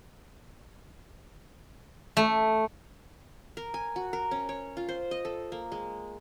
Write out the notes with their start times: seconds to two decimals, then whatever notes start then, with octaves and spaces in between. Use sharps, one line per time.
2.17 A3
3.57 A#4
3.74 G#5
3.96 F#4
4.13 A#4
4.31 C#4
4.49 C#5
4.77 F4
4.89 C5
5.11 D#5
5.25 A4
5.52 A#3
5.72 G#3